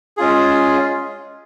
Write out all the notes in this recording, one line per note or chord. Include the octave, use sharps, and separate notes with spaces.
G#3 C#4 F4 G#4